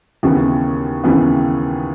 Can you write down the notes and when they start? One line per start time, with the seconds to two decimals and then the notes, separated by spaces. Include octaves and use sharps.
0.23 D#2 C#3 E3 B3
1.04 D#2 C#3 E3 B3